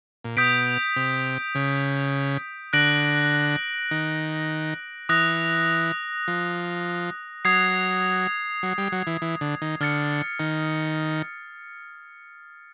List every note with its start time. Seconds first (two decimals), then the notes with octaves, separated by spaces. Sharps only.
0.25 A#2
0.36 B2 D#6 G6 B6 D7
0.96 C3
1.55 C#3
2.73 D3 F#6 A#6 D7 F#7
3.91 D#3
5.09 E3 D#6 F#6 A#6
6.28 F3
7.45 F#3 D#6 G#6 C7
8.63 F#3
8.78 G3
8.92 F#3
9.07 E3
9.22 E3
9.41 D3
9.62 D#3
9.81 D3 F6 A6 C#7
10.40 D#3